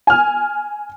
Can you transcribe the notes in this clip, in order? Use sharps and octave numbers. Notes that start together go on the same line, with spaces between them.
G#5 F6